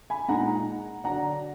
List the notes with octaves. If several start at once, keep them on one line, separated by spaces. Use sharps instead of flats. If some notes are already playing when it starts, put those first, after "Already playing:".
G#5 B5
A#2 G#3 D#4 F#5 A#5
D3 F#3 D4 F#5 A#5